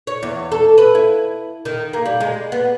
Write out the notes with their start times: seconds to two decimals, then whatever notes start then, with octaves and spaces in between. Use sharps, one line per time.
0.07 C#5
0.23 E2
0.52 A4
0.78 B4
0.95 E4
1.65 D#3
1.93 A#3
2.06 G3
2.21 G#3
2.52 B3